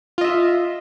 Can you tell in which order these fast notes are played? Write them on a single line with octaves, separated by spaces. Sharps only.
F4 D#5 E5